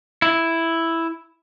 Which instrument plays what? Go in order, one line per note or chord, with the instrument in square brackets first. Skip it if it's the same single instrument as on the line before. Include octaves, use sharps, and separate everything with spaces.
[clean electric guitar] E4